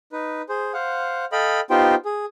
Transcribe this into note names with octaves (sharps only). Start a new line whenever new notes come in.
D#4 B4
G#4 C5
C5 F5 F#5
A4 D#5 F5 G5 B5
B3 D#4 F4 G4 C5 G5
G#4